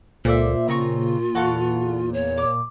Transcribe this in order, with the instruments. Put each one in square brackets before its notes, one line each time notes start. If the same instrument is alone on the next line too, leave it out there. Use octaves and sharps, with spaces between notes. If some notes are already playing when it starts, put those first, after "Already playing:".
[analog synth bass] C#2 [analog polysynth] A#2 [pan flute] A4 [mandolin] C5 D5 E5
[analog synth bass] C#3 [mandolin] C4 A#5 C#6 [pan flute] F4
[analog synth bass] E2 [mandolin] F#4 A4 F5
[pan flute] C#5
[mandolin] D6